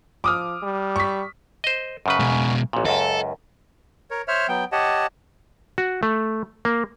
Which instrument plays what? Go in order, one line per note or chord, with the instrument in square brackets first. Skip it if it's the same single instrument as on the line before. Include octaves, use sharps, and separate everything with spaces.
[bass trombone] F3 [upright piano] D6 D#6 F6
[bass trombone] G3
[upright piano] C#6 B6
[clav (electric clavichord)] C5 D#5
F#2 C#3 B4
[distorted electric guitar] B2 G#3
[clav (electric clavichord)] A1 A#2
[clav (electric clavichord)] C#2 F#2 [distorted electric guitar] A4
[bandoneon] A#4 C#5
C5 C#5 E5 F6
F#3 B3 G5
G4 C#5 D#5 F#5 A5
[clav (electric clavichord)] F#4
A3
A#3